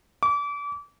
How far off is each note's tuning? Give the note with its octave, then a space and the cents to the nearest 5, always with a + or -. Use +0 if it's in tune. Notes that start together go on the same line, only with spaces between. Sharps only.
D6 -30